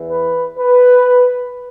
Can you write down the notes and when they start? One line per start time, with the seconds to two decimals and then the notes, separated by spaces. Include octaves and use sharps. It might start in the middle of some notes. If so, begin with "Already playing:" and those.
Already playing: E2 E3
0.09 B4
0.57 B4